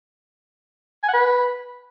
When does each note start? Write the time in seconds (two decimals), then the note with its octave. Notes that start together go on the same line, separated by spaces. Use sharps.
1.03 G#5
1.09 F#5
1.14 B4